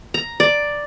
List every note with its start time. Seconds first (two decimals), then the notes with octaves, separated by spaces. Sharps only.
0.14 A#5
0.40 D5